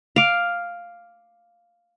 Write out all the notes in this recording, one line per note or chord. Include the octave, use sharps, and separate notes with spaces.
F5 D6